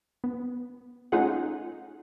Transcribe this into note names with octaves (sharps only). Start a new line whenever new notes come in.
B3
A3 C#4 D#4 F4 G#4 F#5